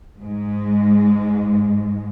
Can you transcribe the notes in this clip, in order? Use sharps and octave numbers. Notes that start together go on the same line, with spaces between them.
G#2 G#3